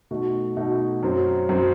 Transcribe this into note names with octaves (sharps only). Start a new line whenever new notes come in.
B2 A3 D#4 F#4
B2 A3 D#4 F#4
F#2 F#3 C4
F#2 F#3 C4